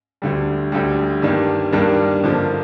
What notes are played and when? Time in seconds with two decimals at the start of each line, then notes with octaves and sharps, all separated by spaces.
0.22 D2 D3 G3
0.72 D2 D3 G3
1.22 G2 D#3 G3 A#3 D4
1.73 G2 D#3 G3 A#3 D4
2.23 G2 D3 F3 A#3